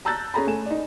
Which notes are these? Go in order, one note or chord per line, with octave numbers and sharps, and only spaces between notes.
A5 A#5 E6 F#6 G6 A6
C#4 G#4 A#5 B5
A3 G#5 E7
D#4 D5